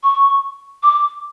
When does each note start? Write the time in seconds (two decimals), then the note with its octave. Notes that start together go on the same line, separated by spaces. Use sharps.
0.03 C#6
0.83 D6